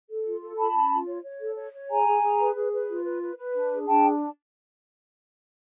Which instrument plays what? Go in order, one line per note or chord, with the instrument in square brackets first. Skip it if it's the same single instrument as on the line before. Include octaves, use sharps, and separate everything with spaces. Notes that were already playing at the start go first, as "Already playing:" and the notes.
[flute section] A4
F4
A4
F4 A5 B5
C#4
F4
C#5
C#5
A4
C#5
C#5
G#4 G#5 A#5
G#4
G#4
B4
G#4
B4
F4
B4
B4
B4
D4
G#4
D4 G5 A5